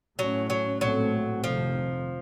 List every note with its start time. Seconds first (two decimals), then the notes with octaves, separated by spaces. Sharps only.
0.19 A2 F#3 A3 C#4
0.50 F#3
0.81 A#1 A2 F#3 A3 C4
1.43 F1 F2 C3 D#3 F3